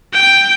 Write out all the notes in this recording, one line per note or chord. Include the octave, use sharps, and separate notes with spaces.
G5